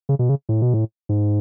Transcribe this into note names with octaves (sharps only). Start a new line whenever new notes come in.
C#3
B2
C#3
A2
B2
A2
G#2